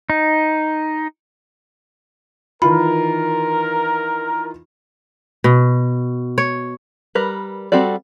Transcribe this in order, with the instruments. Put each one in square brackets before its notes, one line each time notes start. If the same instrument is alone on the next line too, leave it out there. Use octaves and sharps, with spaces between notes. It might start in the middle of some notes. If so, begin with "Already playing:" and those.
[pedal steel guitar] D#4
[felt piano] D#3 E3 F4 [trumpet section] A#4 [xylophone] B5
[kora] B2
C#5
[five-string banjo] G3 A#4 B4
G3 C4 F#4 A4 D5